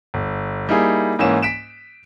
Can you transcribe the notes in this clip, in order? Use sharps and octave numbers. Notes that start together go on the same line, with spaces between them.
G1
G3 A#3 D#4 E4 G#4
G#2 E3 A#3 C#4 E7
B6 D7 E7